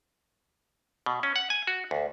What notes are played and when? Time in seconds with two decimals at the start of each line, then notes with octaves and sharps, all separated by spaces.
1.06 B2
1.23 C#4
1.36 F#5
1.50 G#5
1.67 F#4
1.91 D2